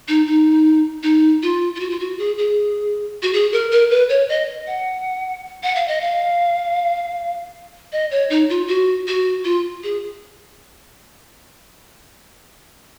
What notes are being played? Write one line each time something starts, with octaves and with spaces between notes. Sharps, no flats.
D#4
D#4
D#4
F4
F4
F#4
F4
F#4
G#4
G#4
F#4
G#4
A#4
A#4
B4
C#5
D#5
F#5
F#5
F5
D#5
F5
D#5
C#5
D#4
F4
F#4
F#4
F4
G#4